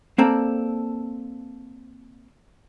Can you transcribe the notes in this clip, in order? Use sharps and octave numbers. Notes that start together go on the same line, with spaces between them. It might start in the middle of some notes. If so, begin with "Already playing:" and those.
A#3 C4 A4 D5